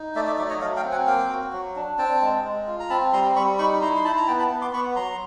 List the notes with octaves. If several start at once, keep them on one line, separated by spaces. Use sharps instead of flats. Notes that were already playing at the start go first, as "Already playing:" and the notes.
Already playing: D#4
A3 D5 E5
D5 E5
F#3 D5 E5
C#5 D#5
F#3 D#5 F5
F5 G5
C4
F#5 G#5
A#3 F5 G5
F#4
F#3
D4
C4 G5 A5
G#3
G#3
F4
A#5
C4 A5 B5
G3 A#5 C6
G3 B5 C#6
D#4 B5 C#6
E4 A#5 C6
C6
E4 A5 B5
A#5
B3 G5 A5
A5 B5
B3
C6 D6
B3 B5 C#6
F#3 A#5 C6